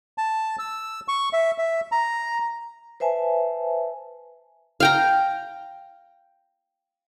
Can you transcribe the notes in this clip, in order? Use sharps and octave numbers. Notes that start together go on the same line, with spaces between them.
A5
E6
C#6
E5
E5
A#5
B4 C5 E5 G#5 A5
F5 G5 A#5